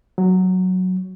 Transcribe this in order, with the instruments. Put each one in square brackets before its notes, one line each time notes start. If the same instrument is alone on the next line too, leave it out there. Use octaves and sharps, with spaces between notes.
[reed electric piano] F#3